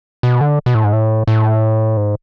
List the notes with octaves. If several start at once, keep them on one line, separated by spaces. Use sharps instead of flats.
B2
D3
B2
A2
G#2
A2
A2
G#2